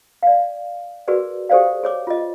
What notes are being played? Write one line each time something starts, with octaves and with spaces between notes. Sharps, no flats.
D5 F5
F#4 G#4 A#4 B4 D5
G4 A4 C5 D5 F5
G#4 C#5 D6
F4 D#5